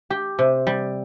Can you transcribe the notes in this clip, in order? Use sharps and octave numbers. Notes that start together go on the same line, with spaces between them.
G4
C3
G3